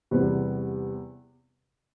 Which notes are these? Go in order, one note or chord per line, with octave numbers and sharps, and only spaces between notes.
E2 C3 G3 B3